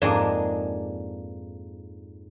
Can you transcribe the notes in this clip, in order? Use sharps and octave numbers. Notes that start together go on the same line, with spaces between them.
F2 G#2 A#3 D4 G#4 D#5